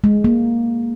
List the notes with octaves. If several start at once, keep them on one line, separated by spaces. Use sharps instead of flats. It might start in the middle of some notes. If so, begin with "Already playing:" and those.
G#3
A#3